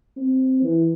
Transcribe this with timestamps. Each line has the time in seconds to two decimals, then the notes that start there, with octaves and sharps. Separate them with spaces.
0.17 C4
0.63 E3